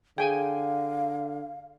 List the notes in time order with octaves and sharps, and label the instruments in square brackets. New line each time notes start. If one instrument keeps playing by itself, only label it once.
[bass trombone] D3 [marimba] G#4 [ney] F5 [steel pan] G5 G#5